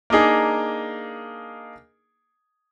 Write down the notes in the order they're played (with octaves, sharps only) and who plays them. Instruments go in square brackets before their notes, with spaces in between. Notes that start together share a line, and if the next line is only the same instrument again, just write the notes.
[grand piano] A#3 D4 D#4 G#4